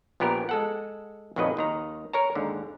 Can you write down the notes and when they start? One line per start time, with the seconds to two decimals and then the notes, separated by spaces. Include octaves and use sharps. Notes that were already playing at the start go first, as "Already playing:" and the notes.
0.20 A#1 A#2 B3 G4 A#4
0.49 G#3 A4 F#5
1.36 A#1 F2 D#3 F#3 B4 D#5
1.57 D#2 D#3 A#5
2.13 A#4 C#5 A#5
2.35 D#2 G#2 D3